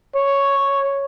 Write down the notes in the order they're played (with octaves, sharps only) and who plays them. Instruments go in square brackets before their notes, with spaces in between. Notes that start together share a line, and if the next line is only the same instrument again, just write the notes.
[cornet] C#5